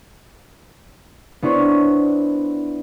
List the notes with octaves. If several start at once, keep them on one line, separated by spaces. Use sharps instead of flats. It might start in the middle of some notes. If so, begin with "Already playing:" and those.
B3 D4 E4 C5 C#5